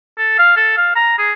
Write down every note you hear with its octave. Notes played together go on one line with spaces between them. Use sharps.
A4
F5
A4
F5
A#5
G#4